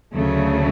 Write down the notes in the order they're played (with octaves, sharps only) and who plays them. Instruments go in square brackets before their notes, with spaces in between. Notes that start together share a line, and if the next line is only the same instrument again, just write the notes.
[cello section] D2 C#3 F#3 A3